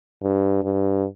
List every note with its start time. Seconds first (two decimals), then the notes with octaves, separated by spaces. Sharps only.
0.23 G2
0.63 G2